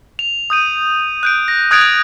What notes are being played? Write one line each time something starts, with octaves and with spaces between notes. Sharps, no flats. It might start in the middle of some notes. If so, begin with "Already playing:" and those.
F7
D#6 G6 D#7
F#6 G6 D7
A#6
D#6 F#6 G#6 A6 D7 F7